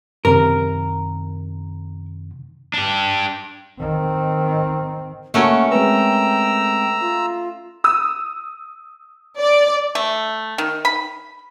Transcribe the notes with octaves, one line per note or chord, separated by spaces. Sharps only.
F#2 C3 D#3 A#4
D4 G4
D#3 C4
A3 A#3 C#4 F#4 A#4 F#5
G#3 C4 B4 G5 A#5 E6
F4
D#6 E6 E7
D5
A3
D#3
B5